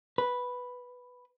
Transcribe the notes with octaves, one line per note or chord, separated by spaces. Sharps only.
B4